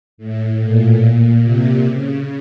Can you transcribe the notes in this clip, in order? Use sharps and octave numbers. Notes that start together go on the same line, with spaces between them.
A2
A#2
A#2
C3
C#3